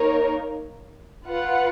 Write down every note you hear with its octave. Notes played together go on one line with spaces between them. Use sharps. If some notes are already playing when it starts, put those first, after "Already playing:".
Already playing: A#3 D#4 A#4 C#5
F4 B4 F#5